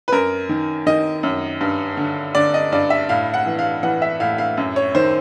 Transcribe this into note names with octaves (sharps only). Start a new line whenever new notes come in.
B4
F#2 A#4
D#3
D#3 D#5
F#2
G2
D3
D3 D5
D#5
G2 D5
E5
A2 F5
F#5
E3
F5
E3 F#5
E5
A2 F5
F5
F#2
C#5
D#3 C5